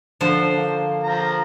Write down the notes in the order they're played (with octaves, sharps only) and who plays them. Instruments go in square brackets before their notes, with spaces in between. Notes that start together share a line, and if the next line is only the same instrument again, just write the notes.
[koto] D3 F3 C5
[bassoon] A#3
[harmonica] F3 A#5